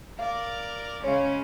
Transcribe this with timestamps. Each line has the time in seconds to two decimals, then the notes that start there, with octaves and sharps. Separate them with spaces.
0.19 A#4 D5 F5
1.04 C#3 G#3 C#4 C#5 F5